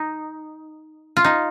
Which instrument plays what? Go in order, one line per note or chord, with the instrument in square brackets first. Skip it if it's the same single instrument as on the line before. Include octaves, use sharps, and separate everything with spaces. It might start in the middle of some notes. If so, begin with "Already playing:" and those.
Already playing: [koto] D#4
F4
D#4